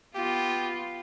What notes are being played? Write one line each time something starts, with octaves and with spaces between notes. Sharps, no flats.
B3 F4 G4